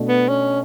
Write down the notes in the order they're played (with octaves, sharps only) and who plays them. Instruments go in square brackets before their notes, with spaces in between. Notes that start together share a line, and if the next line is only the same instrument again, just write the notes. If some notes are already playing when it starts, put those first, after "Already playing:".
Already playing: [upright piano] B2 A3 D4
[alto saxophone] B3
C#4